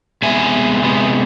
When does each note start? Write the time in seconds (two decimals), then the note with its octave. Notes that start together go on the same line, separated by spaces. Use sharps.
0.22 C3 G#3 B3 E5 G#5
0.82 C3 G#3 B3